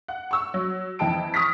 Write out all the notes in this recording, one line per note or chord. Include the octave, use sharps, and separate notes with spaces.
F#5
C#6 E6
F#3
F2 E3 D#5 G5 A5 D7
C#6 D#6 F6 A#6 B6